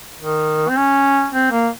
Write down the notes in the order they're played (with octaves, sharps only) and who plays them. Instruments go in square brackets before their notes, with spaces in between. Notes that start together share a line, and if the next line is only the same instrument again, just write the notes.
[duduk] D#3
C4
C#4
C4
A#3